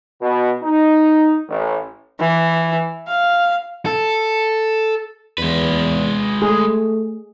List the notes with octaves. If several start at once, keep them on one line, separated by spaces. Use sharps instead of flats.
B2
D#4
A1
E3
F5
A4
E2 G#3 B4
A3 G#4